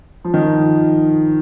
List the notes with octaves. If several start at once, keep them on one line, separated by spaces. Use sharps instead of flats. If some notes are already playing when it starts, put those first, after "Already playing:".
F3
D#3
F3